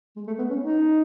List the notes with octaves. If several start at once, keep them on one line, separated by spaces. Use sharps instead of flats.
G#3
A3
B3
C#4
D#4